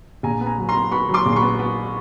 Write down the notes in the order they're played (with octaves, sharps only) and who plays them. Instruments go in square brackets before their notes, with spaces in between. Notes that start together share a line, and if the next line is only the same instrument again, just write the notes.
[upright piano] A#1 G#5 A#5
B3
G#5 A#5
F#3
A#5 C6
B3
B3 B5 C#6
F#3
C6 D6
A#1
C6
B5 C#6
B3
B3